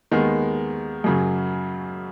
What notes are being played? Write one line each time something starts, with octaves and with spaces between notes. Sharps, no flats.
D#2 D#3 G#3 B3
F#2 C#3 F#3